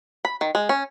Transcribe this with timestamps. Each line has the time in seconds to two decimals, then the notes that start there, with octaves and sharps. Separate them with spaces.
0.25 B5
0.41 D#3
0.55 G#3
0.69 C#4